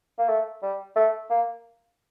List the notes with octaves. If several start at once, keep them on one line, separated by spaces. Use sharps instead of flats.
A#3
A3
G3
A3
A#3